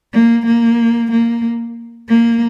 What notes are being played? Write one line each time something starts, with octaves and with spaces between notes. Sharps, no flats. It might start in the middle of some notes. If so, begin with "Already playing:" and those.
A#3
A#3
A#3
A#3